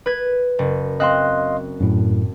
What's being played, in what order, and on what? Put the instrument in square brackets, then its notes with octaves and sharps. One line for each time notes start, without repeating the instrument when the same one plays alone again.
[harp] B4 G#6
F#1
[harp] C4 F#6 [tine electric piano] D#5 F5 C6
[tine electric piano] F#2 A2